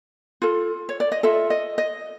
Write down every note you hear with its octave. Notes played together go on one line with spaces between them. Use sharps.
F4 A4
C#5
D5
D#5
F4 A4 E5
D#5
D#5